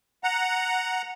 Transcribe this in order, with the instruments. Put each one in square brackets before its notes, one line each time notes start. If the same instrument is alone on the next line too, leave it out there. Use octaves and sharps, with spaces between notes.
[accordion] F#5 A#5